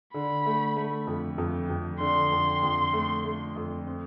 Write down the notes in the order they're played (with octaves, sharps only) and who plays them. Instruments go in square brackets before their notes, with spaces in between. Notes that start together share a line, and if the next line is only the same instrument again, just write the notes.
[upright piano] D3 [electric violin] B5
[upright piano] A3
A3
F2
F2
F2
[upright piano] D3 [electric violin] C6
[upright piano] F2
F2
A3
A3
F2
C4